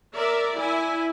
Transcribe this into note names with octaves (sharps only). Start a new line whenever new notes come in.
A#4 D5 E5
E4 G#5